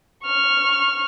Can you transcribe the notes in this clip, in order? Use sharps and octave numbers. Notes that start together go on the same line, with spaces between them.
C#6 F6